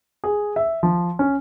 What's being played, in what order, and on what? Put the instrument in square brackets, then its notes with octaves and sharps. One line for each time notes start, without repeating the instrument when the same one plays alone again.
[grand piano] G#4
E5
F3
C#4